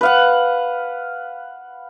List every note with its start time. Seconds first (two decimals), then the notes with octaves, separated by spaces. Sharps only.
0.01 B4 F5 F#5